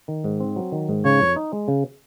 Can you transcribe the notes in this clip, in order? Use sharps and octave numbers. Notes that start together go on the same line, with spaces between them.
D#3
G#2
C4
F#3
D#3
G#2
C#3 C#5
F2
D#4
G#3
C#3